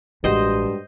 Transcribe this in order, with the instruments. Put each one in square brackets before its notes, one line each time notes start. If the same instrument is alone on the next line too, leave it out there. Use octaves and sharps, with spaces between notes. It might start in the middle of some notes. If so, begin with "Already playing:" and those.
[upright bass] A1 [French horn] G2 [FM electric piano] G#3 F#4 G4 [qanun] C5 D#5